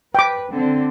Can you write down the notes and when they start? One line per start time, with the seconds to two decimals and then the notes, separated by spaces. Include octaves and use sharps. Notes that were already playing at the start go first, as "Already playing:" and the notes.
0.15 B4 G5 D6
0.51 D3 C4